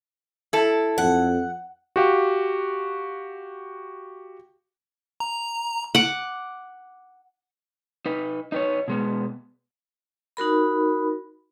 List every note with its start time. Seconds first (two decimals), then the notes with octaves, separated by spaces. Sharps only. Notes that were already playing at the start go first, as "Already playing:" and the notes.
0.53 E4 A4
0.98 F2 F#5
1.96 F#4 G4 F5
5.20 A#5
5.95 F#5 D6
8.06 D#4 B4
8.52 D#4 B4 C#5
8.88 B2 G#3 B3
10.37 D#4 F#4 A#4 B5